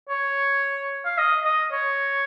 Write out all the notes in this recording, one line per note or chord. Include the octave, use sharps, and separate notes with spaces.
C#5
F5
D#5
D#5
C#5